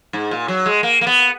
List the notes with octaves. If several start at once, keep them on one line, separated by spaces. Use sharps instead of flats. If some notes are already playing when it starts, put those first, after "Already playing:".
G#2
A#2
F#3
G#3
A#3
A#3
B3